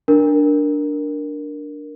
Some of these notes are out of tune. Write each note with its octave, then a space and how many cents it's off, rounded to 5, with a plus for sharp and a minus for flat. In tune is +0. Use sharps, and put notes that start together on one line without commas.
D4 +0 A#4 +0